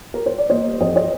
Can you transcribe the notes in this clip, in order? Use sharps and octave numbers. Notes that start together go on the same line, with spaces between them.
A#4
C5
D5
A#3 C5 D#5
G3
F2 C5 D#5
C5 D#5